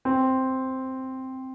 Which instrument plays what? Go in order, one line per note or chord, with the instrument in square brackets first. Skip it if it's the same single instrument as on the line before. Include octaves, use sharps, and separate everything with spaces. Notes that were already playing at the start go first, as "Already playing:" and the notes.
[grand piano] C4